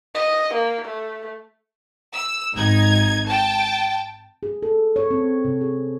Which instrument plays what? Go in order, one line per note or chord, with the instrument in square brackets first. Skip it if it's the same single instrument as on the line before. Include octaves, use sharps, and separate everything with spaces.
[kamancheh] D#5
A#3
A3
[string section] E6
G#1 D#4 G#6
G5 A5
[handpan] G#4
A4
C#5
C4
C3
G#4